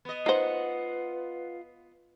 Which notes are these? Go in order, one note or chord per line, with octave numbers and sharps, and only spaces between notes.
B3 D#5
D#4 F4 B4 C5 F#5